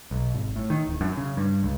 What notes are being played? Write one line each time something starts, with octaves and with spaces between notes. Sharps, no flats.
B1
G#1
A2
D#3
D1
F#2
C#3
G2
C#2